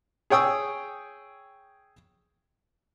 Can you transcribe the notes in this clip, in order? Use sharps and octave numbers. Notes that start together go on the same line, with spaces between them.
G#4 C#5 G5 D#6 E6